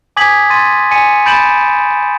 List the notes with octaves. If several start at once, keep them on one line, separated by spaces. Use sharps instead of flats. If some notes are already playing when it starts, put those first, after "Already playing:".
G#5 D6 D#6 G#6 B6 F#7
C6 A6 D#7
G#5 C#7 D#7
B5 G6 A6 D7 E7 F#7